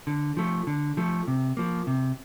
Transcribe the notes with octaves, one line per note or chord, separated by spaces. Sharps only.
D3
F3 A3
D3
F3 A3
C3
F3 A#3
C3